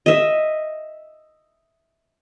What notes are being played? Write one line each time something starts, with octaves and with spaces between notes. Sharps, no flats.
D#5 E5